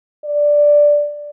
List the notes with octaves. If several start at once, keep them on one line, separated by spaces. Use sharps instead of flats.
D5